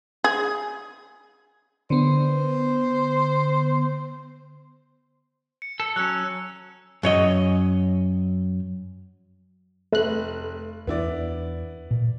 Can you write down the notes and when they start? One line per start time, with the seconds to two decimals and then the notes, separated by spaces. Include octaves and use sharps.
0.24 G#4
1.90 D3 B3 C5
5.62 C#7
5.80 A4
5.96 F#3 C#4 E6 F#6
7.03 F#2 C#5 D#5
9.93 F1 A3 B4 F#6
10.87 E2 B3 D4 E4 D5
11.91 A#2